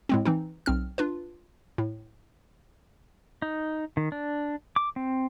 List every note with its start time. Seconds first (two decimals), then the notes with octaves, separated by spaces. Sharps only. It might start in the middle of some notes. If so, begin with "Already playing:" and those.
0.09 A2 G#3 C4
0.25 E3 C4 D#4
0.66 B1 C4 F6
0.98 D4 F4 B4
1.78 A2
3.42 D#4
3.97 D#3
4.12 D4
4.76 D6
4.96 C4